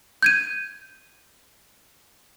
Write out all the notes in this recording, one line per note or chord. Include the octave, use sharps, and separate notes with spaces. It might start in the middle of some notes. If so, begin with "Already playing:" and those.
G6 G#6 D#7